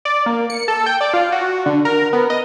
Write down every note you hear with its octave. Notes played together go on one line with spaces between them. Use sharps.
D5
A#3
C#7
A4
G5
D5
F4
F#4
D3
A#4
B3
D#5